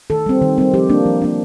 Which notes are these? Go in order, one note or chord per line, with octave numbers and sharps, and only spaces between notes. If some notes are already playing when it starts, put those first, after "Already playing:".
D#3 A4
G3 C4
D#3
G3 C4
F3 G4
A#3 D4
F3
A#3 D4